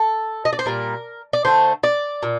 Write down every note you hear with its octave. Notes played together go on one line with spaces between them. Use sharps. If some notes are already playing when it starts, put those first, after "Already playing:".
Already playing: A4
D#5
D5
C5
A#2 G3 A#4
D5
D3 A3 C5
D5
A#2